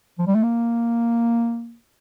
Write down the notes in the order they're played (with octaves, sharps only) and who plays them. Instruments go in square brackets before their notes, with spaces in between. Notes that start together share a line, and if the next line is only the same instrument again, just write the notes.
[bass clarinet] F3
G3
A3
A#3